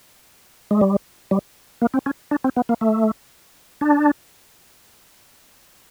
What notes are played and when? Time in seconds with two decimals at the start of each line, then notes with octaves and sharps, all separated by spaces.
0.71 G#3
0.81 G3
1.31 G3
1.82 A#3
1.94 C4
2.06 C#4
2.31 D4
2.44 C4
2.57 B3
2.69 A#3
2.81 A3
3.81 D4